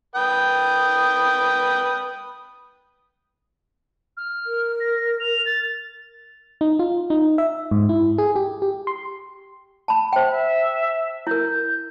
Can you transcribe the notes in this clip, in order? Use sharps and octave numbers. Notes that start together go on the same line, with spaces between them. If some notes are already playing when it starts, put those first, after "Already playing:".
B4 G5 D#6
F6
A#4
A#6
F7
A6
D#4
F4
D#4
E5
G#2
E4
G#4
G4
G4
C6
A5 B5
C5 E5 G5
E5
E4 A#4 G6